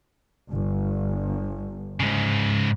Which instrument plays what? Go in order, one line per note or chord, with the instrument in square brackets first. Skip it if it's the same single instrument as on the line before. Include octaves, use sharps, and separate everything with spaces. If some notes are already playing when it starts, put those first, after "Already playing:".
[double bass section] G1
[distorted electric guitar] G#2 C#3